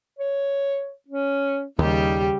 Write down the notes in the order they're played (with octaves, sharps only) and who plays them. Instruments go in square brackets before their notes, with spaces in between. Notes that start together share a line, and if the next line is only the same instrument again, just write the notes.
[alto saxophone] C#5
C#4
[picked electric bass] D#2 [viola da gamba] C#3 G3 G4 [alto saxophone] D#4